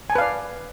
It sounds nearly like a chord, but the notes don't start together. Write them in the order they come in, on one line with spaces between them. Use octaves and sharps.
G#5 A5 B4 F5 D5